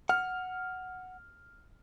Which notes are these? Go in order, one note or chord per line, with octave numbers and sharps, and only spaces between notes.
F#5 F6